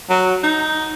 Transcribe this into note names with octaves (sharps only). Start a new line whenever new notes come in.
F#3
D#4